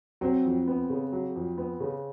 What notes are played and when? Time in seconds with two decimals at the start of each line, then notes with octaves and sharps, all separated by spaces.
0.21 F#3 C4
0.45 F2
0.67 B3
0.90 C#3
1.12 F#3
1.36 F2
1.58 B3
1.80 C#3